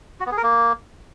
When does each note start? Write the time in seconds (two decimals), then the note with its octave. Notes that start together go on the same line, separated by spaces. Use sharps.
0.20 F#4
0.26 B3
0.32 G#4
0.37 A#4
0.43 A#3